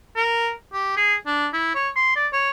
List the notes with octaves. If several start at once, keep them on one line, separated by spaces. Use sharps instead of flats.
A#4
G4
G#4
D4
E4
C#5
C6
D5
C#5